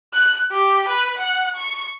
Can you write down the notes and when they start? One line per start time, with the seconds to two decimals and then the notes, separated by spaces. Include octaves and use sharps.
0.13 F#6
0.51 G4
0.88 B4
1.17 F#5
1.56 C#6